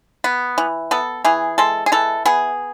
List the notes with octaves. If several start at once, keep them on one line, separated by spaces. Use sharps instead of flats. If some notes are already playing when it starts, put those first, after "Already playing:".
B3
E3
B3 A4
E3 G#4
G#3 A4
G#4
E3 A4
B3 G#4